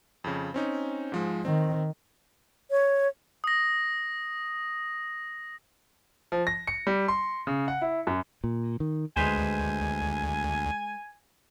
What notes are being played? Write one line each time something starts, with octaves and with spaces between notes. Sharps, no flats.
F2 C#3
C4 C#4 D#4
G#2 F3 G#3
D#3 C4
C#5
D#6 A#6
F3
A#6
C#7
G3
C6
C#3
F#5
E4
F#2
A#2
D#3
D2 G#3 B4 C5 G#5